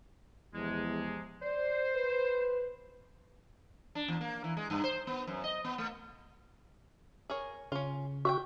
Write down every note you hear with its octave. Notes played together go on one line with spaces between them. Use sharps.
E2 C3 F3 G#3
C5 D5
B4
D4
E2
A#3
E3
G#3
G2
C5
B3
F#2
D#5
B3
A3
G#4 A#4 C#5
C#3 C#4 F4
F#4 E5 F#5 G5